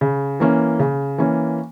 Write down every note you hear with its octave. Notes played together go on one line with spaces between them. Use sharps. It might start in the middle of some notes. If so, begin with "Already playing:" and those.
C#3
E3 A#3 C#4
C#3
E3 A#3 C#4